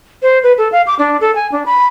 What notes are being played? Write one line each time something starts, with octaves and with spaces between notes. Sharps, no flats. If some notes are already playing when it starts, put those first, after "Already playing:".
C5
B4
A4
F5
D6
D4
A4
G#5
D4
B5